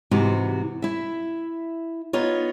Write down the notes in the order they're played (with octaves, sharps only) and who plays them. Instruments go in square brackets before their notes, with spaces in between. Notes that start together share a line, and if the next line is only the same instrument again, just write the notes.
[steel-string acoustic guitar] G#2 C3 E3 F#4
E4 E5
B3 D#4 F4 C#5